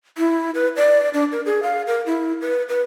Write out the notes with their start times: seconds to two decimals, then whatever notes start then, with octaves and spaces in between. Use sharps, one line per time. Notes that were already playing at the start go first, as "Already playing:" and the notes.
0.18 E4
0.55 B4
0.77 D5
1.14 D4
1.32 A#4
1.46 G#4
1.63 F5
1.87 A#4
2.06 E4
2.41 B4
2.69 B4